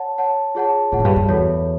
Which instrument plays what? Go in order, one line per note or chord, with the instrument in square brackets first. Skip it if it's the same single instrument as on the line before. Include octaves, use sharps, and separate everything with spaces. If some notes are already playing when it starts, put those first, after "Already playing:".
Already playing: [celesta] C#5 F#5 A5
C#5 F#5 A5
F4 G#4 C#5 F#5 A5
[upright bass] A2 [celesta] F4 G#4 C#5 F#5 A5
[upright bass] F#2
G2
G2
[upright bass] E2 [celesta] F#4 A4 C#5